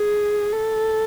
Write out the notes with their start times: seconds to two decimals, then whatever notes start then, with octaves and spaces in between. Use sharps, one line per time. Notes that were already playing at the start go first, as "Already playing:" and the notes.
Already playing: G#4
0.52 A4